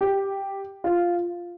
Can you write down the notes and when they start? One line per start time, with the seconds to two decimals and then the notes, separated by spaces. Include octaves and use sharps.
0.01 G4
0.84 F4